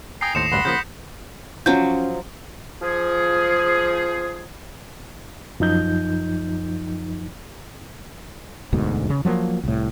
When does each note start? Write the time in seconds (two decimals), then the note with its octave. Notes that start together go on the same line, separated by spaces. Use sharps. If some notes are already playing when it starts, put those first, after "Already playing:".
0.21 G5 G#5 A#5 D#6 C7
0.35 D#2 A2 C5 A#6 C#7 E7
0.52 A1 D2 G2 F#5 B5 C6
0.65 C#3 F3 A#3 G6 B6
1.66 F3 F#3 C#4 G6
2.82 F3 G#4
5.60 F#2 F3 D#4 G6
8.73 E1 D2 G#2 B2
9.10 C#3
9.25 F3 F#3 A3 A#3
9.64 C2 A2